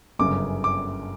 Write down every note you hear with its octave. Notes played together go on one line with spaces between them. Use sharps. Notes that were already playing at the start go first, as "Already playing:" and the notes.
G1 F#2 C#3 D6
D6